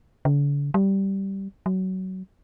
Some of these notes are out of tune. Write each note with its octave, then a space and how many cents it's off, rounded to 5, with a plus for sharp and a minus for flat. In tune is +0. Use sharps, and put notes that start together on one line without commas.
D3 -45
G3 -10
F#3 +20